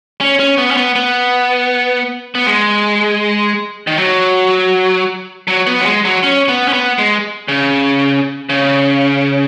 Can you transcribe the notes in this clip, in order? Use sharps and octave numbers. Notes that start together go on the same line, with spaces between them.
C#4
C#4
B3
C#4
B3
B3
B3
G#3
D#3
F#3
F#3
B3
F#3
G#3
F#3
C#4
B3
C#4
B3
G#3
C#3
C#3